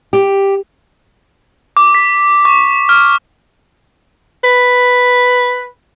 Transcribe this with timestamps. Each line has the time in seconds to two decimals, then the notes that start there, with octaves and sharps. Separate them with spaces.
0.13 G4
1.77 D6
1.95 B6
2.45 C#6
2.89 F6
4.44 B4